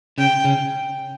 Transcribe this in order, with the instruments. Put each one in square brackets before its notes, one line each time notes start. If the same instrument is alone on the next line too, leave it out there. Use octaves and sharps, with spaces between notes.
[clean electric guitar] C#3 C#4 [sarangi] G5
[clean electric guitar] C#3 C#4